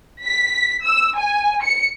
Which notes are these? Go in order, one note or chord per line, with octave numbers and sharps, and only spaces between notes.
B6
E6
G#5
C#7